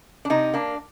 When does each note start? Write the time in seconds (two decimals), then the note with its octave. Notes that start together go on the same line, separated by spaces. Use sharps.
0.25 D4
0.30 C3 D#4
0.54 A#3 D4